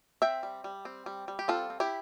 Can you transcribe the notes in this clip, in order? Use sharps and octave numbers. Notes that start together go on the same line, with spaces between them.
C4 E5 G5
G3
G3
C4
G3
G3
G4
C4 F4 A4
C4
E4 G4